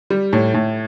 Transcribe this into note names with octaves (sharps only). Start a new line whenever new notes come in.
G3
A2
A2